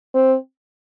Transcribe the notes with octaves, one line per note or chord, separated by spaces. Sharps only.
C4